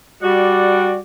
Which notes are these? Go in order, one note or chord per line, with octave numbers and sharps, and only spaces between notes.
G3 F#4 D5